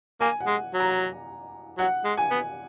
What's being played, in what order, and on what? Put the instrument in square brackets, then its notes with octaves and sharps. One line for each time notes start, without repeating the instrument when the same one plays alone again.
[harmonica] A#3 [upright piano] G#5
[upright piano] F#5
[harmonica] G#3
F#3
[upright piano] A#5
[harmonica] F#3 [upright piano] F#5
[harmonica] G#3
[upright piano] G#5
[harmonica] B3